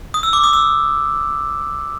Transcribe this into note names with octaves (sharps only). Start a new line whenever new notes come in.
D#6
E6
D6
D#6
E6